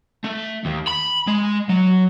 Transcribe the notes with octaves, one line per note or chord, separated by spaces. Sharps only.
A3
D#2
B5
G#3
F#3